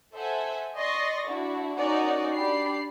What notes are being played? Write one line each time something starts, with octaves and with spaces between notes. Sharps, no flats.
A4 C5 E5 F#5 G#5
D5 D#5 C6 C#6 A6 A#6
D4 E4 F#4
C#4 D#4 F#4 A#4 D5 F#5
D4 G4 D5 B5 C7